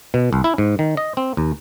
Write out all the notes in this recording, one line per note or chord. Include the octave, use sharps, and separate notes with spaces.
B2
C2
E4
G#2
D#3
D#5
C4
D#2